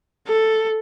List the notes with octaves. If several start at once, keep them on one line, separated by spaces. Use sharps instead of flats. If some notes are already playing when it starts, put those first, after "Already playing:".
A4